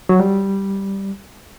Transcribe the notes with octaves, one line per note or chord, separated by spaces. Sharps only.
F#3
G3